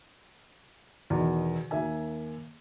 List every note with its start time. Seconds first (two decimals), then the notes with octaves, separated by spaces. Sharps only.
1.10 E2 B2 D#3
1.71 D#2 A#3 E5 G#5